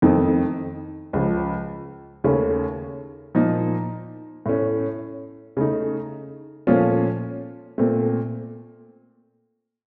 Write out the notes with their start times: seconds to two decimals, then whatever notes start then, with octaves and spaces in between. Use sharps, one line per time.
0.02 F2 D#3 A3 C4 D#4
1.13 C#2 C#3 F3
2.24 D#2 C#3 A3 C#4
3.35 A#2 F3 A#3 D#4
4.46 A2 A3 C#4
5.57 C#3 A3 D#4
6.67 A#2 F3 A3 C#4 F4
7.78 A#2 A3 C4